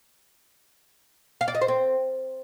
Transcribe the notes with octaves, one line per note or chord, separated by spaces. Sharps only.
F5
D5
D#5
C5
C4